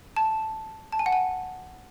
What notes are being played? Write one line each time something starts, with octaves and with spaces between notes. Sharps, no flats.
A5
A5
G#5
F#5
G#5